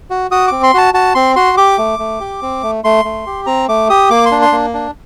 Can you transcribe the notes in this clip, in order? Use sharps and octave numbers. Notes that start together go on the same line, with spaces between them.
F#4
F#4 D#6
C4 D6
C6
F#4 A5
F#4 A5
C4 C6
F#4 C6
G4 D6
A3
A3
G4
C4
A3
A3 C6
A3
G4
C4 A#5
A3 D6
G4 D#6
A#3 D6
C6
D4
C6
A#3
D4